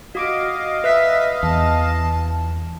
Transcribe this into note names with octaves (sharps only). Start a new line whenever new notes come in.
F#4 D#5 F5 D6 D7
B4 E5 F#6 B6
E2 A5